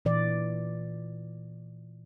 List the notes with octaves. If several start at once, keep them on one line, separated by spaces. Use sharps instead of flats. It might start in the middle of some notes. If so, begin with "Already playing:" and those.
A#2 E3 D5